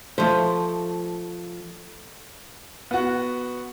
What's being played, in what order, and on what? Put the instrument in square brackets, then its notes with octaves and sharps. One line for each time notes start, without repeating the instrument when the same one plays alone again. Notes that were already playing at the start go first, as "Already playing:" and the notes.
[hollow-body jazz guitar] F3 C5 [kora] A3
[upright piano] B3 F#4